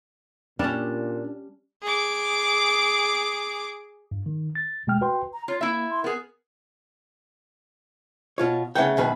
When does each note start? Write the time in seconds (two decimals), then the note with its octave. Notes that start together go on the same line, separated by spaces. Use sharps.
0.59 A#2 G3 C#4 D4
1.82 G#4 D6
4.11 G2
4.26 D#3
4.55 A6
4.87 B2 G#3 A3 G5 F6
5.01 F#4 B4 G5 C6
5.33 A#5
5.48 F4 C#5
5.61 A#3 E4 E5
5.90 C6
6.04 B3 G#4 A#4
8.38 B2 F4 C#5
8.75 C#3 A3 A#3 B4 F#5 G5
8.97 F#2 B2 D#3 B4